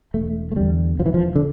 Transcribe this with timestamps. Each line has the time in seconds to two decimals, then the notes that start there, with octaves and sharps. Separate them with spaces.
0.14 E1 A3
0.52 A3
0.56 E2 D3 G3
0.99 E1 F3
1.06 E3
1.14 F3
1.36 D3